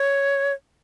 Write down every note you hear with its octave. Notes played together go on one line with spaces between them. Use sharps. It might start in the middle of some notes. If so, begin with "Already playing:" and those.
Already playing: C#5